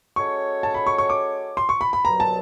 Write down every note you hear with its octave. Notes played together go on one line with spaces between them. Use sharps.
G#3 C#4 F#4 A4 C#5 C#6
A5
B5
C#6
C#6
D6
C6
C#6
B5
B5
C2 B2 F#3 A#5
A5